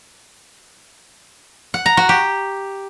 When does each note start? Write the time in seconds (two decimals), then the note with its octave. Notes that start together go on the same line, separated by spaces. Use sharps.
1.74 F#5
1.86 A#5
1.97 F#4
2.09 G4